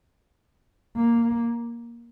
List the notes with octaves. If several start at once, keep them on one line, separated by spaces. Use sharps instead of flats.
A#3